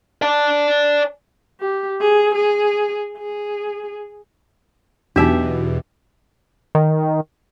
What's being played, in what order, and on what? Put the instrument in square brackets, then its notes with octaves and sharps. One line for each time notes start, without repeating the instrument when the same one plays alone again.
[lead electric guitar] D5 A5
[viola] G4
G#4
G#4
G#4
[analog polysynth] E2 B2 [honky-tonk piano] E3 F#3 [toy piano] D4 D#4 [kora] G4 E5
[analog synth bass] D#3